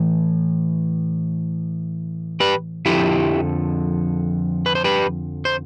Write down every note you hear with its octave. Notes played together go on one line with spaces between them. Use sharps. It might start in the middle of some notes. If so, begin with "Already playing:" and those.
Already playing: A2 E3
G4 B4
F2 D3 F3 E4 G4
B4
C5
G4 B4
C5